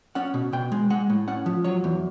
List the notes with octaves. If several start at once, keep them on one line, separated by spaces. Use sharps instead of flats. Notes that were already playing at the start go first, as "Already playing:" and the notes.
C#4 F#5
B2
B2 G5
G#3
G#3 F#5
A2
C#4 F#5
F3
F#3 C#5
E2